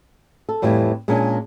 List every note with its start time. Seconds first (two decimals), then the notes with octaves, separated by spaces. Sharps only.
0.49 A4
0.62 F2 A2 E3 G3
1.08 A#2 G#3 A#3 C#4 D4